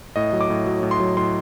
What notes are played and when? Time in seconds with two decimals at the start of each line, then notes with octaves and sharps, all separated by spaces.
0.16 A2 D#5
0.33 F#3
0.41 D6
0.50 A2
0.66 F#3
0.83 A2
0.91 C6
1.00 F#3
1.17 A2 C6